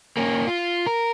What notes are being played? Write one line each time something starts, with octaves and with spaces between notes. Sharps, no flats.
A#3 C#4
F4
A#4